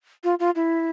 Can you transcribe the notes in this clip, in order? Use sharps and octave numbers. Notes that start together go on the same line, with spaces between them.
F4
F4
E4